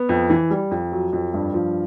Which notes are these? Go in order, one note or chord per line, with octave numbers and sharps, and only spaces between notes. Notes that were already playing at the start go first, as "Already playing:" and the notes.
Already playing: B3
F2
E3
G3
F2
F#3
F2
G2
F3